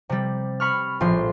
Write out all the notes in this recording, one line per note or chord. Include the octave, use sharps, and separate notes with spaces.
C3 G3
B5 C#6 F6
A#1 A2 F3 C6